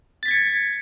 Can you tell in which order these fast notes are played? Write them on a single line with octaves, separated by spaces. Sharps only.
A6 B6 G#6 C#7